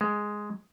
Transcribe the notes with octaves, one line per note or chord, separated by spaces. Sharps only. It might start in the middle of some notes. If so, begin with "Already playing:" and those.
G#3